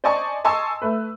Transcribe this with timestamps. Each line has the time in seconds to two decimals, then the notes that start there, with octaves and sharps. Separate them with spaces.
0.04 C5 D5 D#5 G#5 A5 C#6
0.44 D#5 G#5 A5 C6 C#6 E6
0.82 A3 B4